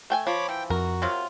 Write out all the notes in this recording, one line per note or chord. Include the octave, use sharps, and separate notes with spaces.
A3 G5 G#5
F3 C#5 B5 D6
E3 G5
F2 F#4 A#4
C3 F#3 F4